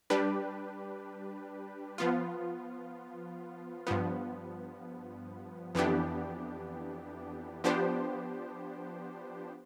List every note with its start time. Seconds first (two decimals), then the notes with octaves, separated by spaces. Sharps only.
0.10 G3 D4 G4 B4
1.98 F3 B3 F4
3.87 G2 F3 B3
5.75 F2 E3 B3 D4 G4
7.64 F3 B3 D4 G4 C5